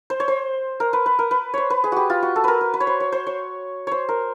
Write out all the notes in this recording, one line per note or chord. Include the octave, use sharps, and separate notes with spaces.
C5
C#5
C5
A#4
B4
B4
A#4
B4
C5 C#5
B4
G#4
F#4 G4
F4
F#4
A4
A#4 B4
B4
B4
C#5
C5
C#5
C5
C#5
C5 C#5
A#4